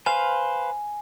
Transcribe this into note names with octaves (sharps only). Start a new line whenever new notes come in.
B4 C5 F5 G#5